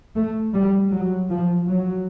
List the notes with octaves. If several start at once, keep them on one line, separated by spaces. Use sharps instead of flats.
A3
G3
F#3
F3
F#3